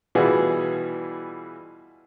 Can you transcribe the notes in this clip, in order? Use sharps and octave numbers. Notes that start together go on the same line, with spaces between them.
B2 E3 G3 F4 F#4 G#4